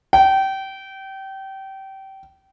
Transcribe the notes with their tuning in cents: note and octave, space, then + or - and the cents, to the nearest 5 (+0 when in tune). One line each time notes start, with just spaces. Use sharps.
G5 -25